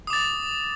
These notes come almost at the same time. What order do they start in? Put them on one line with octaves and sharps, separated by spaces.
D#6 D6 A6